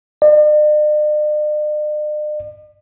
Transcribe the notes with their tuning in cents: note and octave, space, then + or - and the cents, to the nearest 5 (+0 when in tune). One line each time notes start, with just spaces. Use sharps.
D5 +45